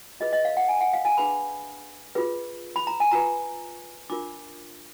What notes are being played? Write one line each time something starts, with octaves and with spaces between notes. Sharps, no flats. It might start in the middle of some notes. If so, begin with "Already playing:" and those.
F4 G#4 B4 D#5
D#5
F5
F#5
G#5
F#5
F5
G#5
D4 G#4 B4 B5
F4 G#4 B4
B5
A#5
G#5
F4 B4 A#5
D4 F4 A#4 D6